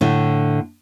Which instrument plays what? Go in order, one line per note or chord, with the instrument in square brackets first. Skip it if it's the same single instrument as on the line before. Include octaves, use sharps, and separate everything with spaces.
[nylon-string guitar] A2 D3 A3